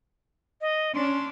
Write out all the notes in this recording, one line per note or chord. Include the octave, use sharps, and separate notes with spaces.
D#5
C#4 D4 C6